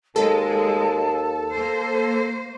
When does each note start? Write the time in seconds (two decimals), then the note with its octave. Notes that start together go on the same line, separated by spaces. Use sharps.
0.16 D#2 G#3 A4 A5
1.53 A#3 C5